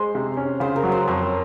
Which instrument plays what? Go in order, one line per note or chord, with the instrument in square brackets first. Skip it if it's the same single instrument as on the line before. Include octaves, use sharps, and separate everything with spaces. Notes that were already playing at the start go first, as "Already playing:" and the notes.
Already playing: [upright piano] G#3 [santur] C5
[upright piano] C3
C#4
[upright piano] C#3 [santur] C5
[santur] A#4
[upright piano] F#3
[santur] C5
[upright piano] F2 [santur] C#5
[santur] C5